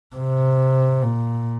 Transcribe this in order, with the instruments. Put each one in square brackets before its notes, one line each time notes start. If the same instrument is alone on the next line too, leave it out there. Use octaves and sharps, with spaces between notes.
[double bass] C3
A#2